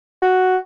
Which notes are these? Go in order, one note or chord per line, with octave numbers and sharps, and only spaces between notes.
F#4